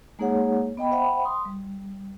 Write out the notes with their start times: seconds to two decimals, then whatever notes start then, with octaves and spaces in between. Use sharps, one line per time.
0.19 G#3 A#3 D#4 G#4 C#5 F#5
0.77 B3 D#5 G5 B5
0.92 C5 E5 F#5 G5 B5
1.25 C6 D#6
1.45 G3